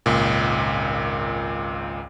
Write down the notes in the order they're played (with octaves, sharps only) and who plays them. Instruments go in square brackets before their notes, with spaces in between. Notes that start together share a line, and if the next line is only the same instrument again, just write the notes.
[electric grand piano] G#1 C#2 A#2